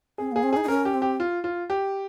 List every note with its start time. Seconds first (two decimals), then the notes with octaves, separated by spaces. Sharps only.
0.18 C4 G#4
0.32 A#3 G#4
0.43 C4
0.53 D#4 G#4
0.64 D#4
0.68 C#4 A#4
0.85 G4
0.94 C4
1.02 G4
1.20 F4
1.44 F4
1.70 G4